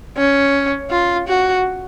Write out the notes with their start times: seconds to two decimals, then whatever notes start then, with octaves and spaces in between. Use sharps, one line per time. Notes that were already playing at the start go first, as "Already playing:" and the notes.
0.17 C#4
0.91 F4
1.28 F#4